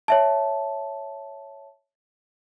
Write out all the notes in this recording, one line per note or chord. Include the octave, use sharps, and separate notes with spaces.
C#5 E5 A5